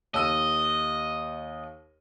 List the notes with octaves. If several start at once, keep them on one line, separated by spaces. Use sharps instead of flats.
D#2 D#5 E6 D#7